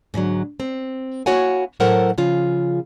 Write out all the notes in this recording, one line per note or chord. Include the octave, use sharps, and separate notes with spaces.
G#2 D3 F3 F#3
C4
A#3 E4 F#4 C#5 F#5 G#5
A2 F#3 A4 A#4 C5 F#5
C#3 F3 F4 G#4